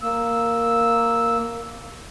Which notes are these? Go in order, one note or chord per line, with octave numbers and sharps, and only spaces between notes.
A#3 E6